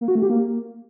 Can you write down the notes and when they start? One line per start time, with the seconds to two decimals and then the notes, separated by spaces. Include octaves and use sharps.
0.01 A#3
0.08 F#4
0.15 A3
0.23 G4
0.30 A#3